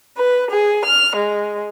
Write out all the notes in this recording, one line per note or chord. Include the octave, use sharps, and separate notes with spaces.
B4
G#4
F6
G#3